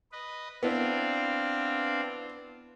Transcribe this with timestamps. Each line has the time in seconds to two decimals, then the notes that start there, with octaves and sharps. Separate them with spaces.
0.12 B4 D#5
0.63 B3 C4 D4 E4 F5